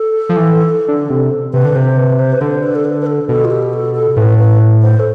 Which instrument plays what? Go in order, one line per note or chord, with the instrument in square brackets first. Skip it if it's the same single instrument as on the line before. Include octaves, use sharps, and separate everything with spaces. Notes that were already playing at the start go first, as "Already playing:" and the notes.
Already playing: [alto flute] A4
[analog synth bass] F3
E3
D3
C3
[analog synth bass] C3 [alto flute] B4
[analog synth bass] D3
[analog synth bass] C3 [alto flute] C5
[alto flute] B4
C5
B4
[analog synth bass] D3 [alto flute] C5
[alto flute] B4
A4
B4
B4
A4
[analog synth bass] B2 [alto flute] A4
[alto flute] F4
G4
A4
A4
[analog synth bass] A2 [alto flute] B4
[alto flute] B4
C5
A4